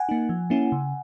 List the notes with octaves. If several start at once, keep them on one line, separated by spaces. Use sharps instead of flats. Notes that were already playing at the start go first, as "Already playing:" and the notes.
Already playing: F#5 G#5
A#3 D#4
F3
A#3 C#4 E4
C#3